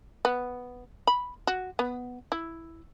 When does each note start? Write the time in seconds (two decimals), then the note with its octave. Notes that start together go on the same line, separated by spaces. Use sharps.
0.25 B3
1.07 B5
1.47 F#4
1.79 B3
2.32 E4